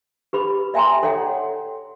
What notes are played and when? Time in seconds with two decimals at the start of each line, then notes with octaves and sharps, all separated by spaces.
0.33 G4 B4 B5
0.74 D5 E5 G5 G#5 A#5 C6
1.03 A4 C#5 D5 F#5 G5